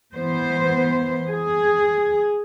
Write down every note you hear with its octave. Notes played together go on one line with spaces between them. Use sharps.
E3 B3 C5
G#4